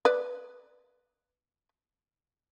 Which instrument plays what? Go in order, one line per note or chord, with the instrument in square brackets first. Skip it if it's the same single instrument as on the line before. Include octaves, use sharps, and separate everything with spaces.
[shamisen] B4 D5